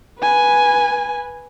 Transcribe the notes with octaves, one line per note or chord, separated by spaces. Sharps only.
B4 G#5